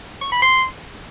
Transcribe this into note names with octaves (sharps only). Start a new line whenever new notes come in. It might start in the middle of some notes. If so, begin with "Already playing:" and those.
C#6
B5
C6